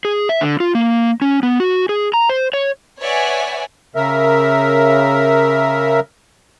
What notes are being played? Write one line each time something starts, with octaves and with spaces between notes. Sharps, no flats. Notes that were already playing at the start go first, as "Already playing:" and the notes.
G#4
E5
D3
F4
A#3
C#4
B3
F#4
G#4
A#5
C5
C#5
B4 C#5 D5 E5 F#5 G#5
C#3 A#4 E5